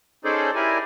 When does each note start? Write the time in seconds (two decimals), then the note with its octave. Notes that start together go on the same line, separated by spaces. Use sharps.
0.25 C#4 D#4 G#4 A4 C5 D5
0.55 E4 G4 A#4 D5 G#5